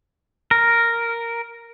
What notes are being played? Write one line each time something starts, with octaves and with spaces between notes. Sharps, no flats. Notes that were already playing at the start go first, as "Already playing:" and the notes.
A#4